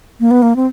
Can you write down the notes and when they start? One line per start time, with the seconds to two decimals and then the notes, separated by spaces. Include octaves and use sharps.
0.20 A#3
0.31 B3
0.42 A#3
0.56 C4